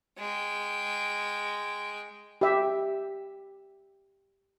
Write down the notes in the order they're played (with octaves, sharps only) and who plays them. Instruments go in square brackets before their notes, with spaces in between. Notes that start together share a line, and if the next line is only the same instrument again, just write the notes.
[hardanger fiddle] G#3 G5
[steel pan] G4 E5